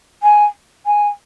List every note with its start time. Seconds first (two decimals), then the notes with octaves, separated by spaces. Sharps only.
0.23 G#5
0.86 G#5